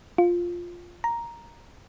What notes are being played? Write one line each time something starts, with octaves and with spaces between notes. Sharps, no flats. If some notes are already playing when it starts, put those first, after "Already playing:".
F4
A#5